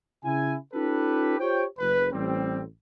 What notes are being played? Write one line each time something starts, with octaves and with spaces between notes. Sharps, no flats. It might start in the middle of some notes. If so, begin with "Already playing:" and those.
C#3 E4 G#5
C#4 D#4 F4 G4 A4 B4
F4 G4 C5 C#5 G5
F#1 B4
A1 G3 C4